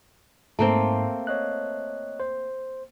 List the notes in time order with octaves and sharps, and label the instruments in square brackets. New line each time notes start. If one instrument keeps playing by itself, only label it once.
[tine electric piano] G#2 [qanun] A3 A#3 C4
[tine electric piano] C#5 D#5 F#6
C5